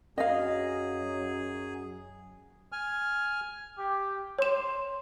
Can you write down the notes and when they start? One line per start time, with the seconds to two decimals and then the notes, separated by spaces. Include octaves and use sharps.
0.18 F#2 F#3 G#4 D#5 F5
2.72 G#5 F6
3.78 G4
4.39 C#5 C6 E7